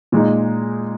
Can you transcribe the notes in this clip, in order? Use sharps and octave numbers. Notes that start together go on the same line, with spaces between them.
A#2 G#3 D#4